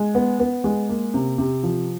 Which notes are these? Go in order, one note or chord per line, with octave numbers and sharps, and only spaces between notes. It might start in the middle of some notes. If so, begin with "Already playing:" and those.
Already playing: G#3
B3
B3
G#3
A#3
C3
C3
F3